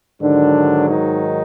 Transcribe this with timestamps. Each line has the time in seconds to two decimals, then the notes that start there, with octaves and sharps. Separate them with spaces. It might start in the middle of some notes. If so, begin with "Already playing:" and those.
0.21 G#2 D3 D#3 F#3 D4
0.89 D#3 D#4